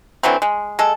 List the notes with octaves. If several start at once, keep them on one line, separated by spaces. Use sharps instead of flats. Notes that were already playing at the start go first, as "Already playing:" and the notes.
D3 E3 F#3 C4
G#3
G#3 A4